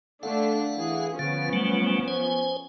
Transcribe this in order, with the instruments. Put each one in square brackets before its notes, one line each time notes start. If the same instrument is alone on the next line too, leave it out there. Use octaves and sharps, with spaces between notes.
[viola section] D3 A3 D4 [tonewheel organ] F5 F#5
[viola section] E3 G#4
[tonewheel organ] D3 F5 [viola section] F3 B3 C#4
[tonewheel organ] F#3 G3 A3
C5 G#5